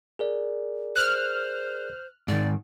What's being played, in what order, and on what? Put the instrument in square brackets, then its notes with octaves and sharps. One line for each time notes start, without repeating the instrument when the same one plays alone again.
[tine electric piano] G#4 A#4 D5
[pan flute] C5 [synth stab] F6 F#6
[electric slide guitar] G#2 D#3 [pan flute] D5